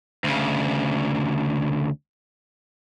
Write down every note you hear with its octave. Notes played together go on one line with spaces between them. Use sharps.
D2 C#3